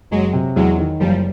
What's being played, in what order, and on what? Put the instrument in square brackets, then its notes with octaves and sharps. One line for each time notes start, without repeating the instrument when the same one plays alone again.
[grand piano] F#1 [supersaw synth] F#3 G#3
[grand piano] C3
[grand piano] E2 [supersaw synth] F#3 G#3
[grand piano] D#3
[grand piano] F#1 [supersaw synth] F3 G3